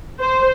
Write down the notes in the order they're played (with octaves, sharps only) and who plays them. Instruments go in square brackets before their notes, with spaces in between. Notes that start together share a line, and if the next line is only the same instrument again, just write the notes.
[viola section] C5